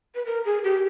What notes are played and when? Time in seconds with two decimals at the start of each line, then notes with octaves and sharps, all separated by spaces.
0.15 B4
0.25 A#4
0.45 G#4
0.64 G4